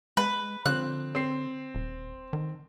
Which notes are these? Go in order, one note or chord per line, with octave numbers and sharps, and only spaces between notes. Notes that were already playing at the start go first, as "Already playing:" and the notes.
G#3 B4
D3 F3 C4 F#6
C4 C7
D#1
D#3